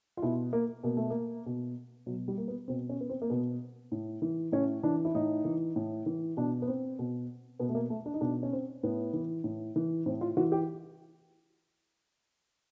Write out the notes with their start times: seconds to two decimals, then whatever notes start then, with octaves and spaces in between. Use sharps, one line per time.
0.17 F4
0.22 B2 E4
0.53 A#3
0.84 B2 A#3
0.97 A3
1.10 A#3
1.46 B2
2.06 B2 F#3
2.28 G3
2.38 A#3
2.48 B3
2.68 B2 C4
2.89 C#4
3.01 B3
3.10 C4
3.22 A#3
3.30 B2 B3
3.92 A2
4.22 E3
4.52 A2 C#4
4.83 E3 D4
5.05 E4
5.15 A2 D#4
5.45 E3
5.76 A2
6.06 E3
6.37 B2 D4
6.62 B3
6.68 C4
6.99 B2
7.59 B2 B3
7.69 A3
7.75 A#3
7.90 A3
8.06 D4
8.14 D#4
8.21 B2 D4
8.43 C#4
8.53 C4
8.83 A2 B3
9.13 E3
9.44 A2
9.76 E3
10.06 A2 C4
10.21 F4
10.37 E3 F#4
10.52 G4